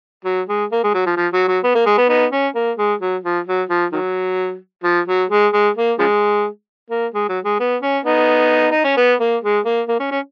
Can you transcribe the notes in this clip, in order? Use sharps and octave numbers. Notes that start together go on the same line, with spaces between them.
F#3
G#3
A#3
G#3
F#3
F3
F3
F#3
F#3
B3
A#3
G#3
B3
B3 D#4
C#4
A#3
G#3
F#3
F3
F#3
F3
D#3 F#3
F3
F#3
G#3
G#3
A#3
C#3 F3 G#3
A#3
G#3
F#3
G#3
B3
C#4
B3 D#4
D#4
C#4
B3
A#3
G#3
A#3
A#3
C#4
C#4